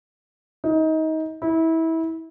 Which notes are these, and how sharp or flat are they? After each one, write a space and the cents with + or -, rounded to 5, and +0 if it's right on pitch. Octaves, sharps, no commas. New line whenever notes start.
D#4 +25
E4 -25